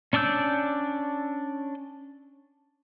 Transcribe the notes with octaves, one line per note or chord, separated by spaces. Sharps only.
C#4 D4 D5 E6 G6